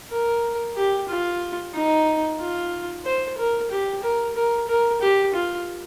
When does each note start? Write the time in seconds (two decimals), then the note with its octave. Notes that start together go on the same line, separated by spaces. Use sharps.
0.11 A#4
0.76 G4
1.09 F4
1.74 D#4
2.40 F4
3.05 C5
3.38 A#4
3.71 G4
4.03 A#4
4.36 A#4
4.68 A#4
5.01 G4
5.34 F4